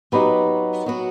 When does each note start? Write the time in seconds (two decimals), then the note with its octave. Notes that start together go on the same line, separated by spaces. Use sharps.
0.12 F#3 B3 D#4 G4 B4
0.86 F#3 B3 F#4